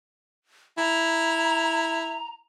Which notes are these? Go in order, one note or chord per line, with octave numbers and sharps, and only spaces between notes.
E4 A#5